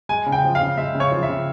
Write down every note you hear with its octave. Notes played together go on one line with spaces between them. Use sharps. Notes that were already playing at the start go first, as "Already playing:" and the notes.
G#3 G#5
C#3
G5
F3
F5
C#3
G#3 E5
C#3
C#5
F3
E5
C#3